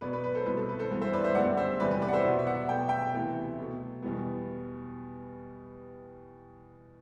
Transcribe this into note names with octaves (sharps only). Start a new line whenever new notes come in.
B2 F#3 B3 B4 D5
B4
B4
A4 C5
C2 B2 F#3 B4
A4
B4
A4 C5
G2 E3 B3
C5 E5
B4 D5
C5 E5
F#2 D3 G3 B3 D5 F#5
C5 E5
E2 C3 G3 B3 B4 D5
B4 D5
B4 D5
F#5
C5 E5
B2 F#3 B3
E5
D5 F#5
B2 A3 G5
E5 G5
D2 C3 E3 B3
B2 F#3 A3
E2 B2 G3 B3